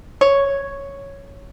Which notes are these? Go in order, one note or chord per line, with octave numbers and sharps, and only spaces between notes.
C#5